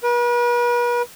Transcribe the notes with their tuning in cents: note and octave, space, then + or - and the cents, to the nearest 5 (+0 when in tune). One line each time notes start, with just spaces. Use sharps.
B4 -40